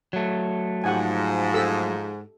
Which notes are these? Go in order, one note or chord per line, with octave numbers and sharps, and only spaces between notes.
F#3 A3
G#2 F3 G4 F#5 G#5
G4 A4 E6